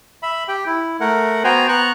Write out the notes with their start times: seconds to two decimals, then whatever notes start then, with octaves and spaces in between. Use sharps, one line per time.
0.23 E5 B5
0.48 G4 G5
0.66 E4
1.00 A3 A#4 F#5
1.44 B3 F#4 C5 G5 G#5 A#5
1.69 B3 A#5 C#6 F#6